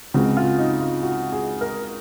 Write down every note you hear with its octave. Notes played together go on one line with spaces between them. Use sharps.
C#2 C#3 G#3 C4 F#4
F4
D#4
F4
F#4
G#4
A#4